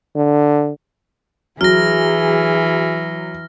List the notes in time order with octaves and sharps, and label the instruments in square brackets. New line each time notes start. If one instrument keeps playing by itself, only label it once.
[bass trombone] D3
[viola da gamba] E3 [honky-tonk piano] F#3 [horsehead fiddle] G#4 [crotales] F6 A#6